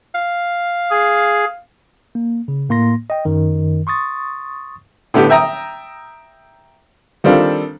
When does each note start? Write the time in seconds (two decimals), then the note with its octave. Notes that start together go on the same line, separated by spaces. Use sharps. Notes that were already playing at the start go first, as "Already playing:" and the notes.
0.15 F5
0.91 G#4
2.15 A#3
2.48 C#3
2.69 A2 A#3 C6 A#6
3.10 D#5 G5
3.25 F#2 D#3
3.87 C6 C#6 D#6 A6
5.14 A2 D3 B3 G4
5.30 E5 G5 A#5 D#6
7.24 D#3 G3 C4 D4 F4 A4